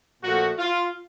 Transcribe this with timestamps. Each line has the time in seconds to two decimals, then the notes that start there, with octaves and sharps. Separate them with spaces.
0.23 A#2 F3 A3 F#4
0.58 F4